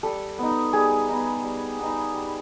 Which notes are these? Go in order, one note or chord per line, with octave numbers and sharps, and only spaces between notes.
G3 A4
B3 D#4
G3 G#4
B3 D#4
G3
B3 D#4
G3